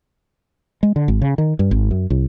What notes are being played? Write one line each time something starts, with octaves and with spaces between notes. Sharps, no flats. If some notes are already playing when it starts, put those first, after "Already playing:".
G#3
D3
G#1
C#3
D#3
G2
G#1
F#2
C2